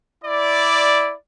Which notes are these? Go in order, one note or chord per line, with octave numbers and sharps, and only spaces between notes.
E4 D5